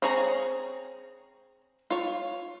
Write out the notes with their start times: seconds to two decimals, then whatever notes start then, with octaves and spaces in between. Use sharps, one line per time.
0.02 C4 G#4 C#5 G#5 A#5
1.90 F4 C#5